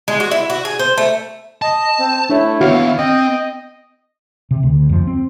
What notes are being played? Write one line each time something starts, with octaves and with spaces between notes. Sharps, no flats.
G#3
F#4
E4
F#4
G#4
C5
A3
D#5 A5
C4
A3 D4 E4 C#5
D#2 B3 F#4 C#5 F5
C4 D#5 G5
C3
D2
F2 F3
C4